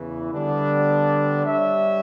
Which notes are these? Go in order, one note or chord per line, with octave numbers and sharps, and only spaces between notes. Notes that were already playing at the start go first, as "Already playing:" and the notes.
Already playing: E2 C#3 E3
D3 G3 B3 D4
G3 D4 G4 C#5 E5